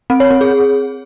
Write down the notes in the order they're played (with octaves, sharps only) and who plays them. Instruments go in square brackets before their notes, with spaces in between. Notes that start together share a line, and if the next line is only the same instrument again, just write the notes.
[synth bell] C4
C#5
C4
G#4